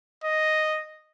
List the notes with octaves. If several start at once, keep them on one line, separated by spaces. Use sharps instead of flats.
D#5